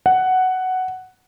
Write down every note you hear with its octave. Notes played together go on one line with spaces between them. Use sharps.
F#5